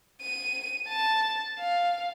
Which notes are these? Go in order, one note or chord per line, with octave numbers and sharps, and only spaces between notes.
D#7
A5
F5